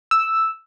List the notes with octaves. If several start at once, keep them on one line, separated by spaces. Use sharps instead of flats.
E6